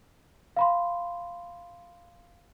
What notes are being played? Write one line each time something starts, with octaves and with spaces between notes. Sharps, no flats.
F5 B5 C6